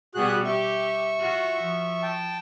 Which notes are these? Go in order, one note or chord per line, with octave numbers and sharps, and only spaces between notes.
B2 G3 B3 F#4 G#4 F#6
G4 E5 C#6
F4 F#4
F3
G5 A5